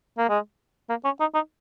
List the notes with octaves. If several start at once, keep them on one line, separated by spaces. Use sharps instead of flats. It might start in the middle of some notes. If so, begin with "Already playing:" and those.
A#3
G#3
A#3
C#4
D#4
D#4